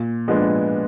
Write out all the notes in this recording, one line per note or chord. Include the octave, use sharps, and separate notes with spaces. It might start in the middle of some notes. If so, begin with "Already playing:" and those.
Already playing: A#2
F3 G#3 B3 D4